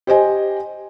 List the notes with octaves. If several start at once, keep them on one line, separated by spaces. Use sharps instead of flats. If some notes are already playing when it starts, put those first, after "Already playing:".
G4 C5 D#5 G#5